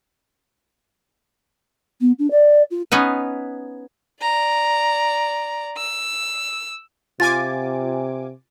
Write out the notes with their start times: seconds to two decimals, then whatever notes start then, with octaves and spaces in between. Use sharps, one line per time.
2.01 B3
2.19 D4
2.31 D5
2.70 F4
2.92 B3 C#4 D#4 B4
4.22 D5 A#5
5.78 E6
7.20 C3 F4 G#5 D6 A6